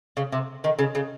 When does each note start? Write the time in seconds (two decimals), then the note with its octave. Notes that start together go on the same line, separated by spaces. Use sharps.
0.17 C#3
0.32 C3
0.64 D#3
0.79 C#3
0.95 C#3